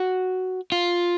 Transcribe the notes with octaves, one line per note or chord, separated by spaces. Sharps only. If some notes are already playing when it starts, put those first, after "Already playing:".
Already playing: F#4
F4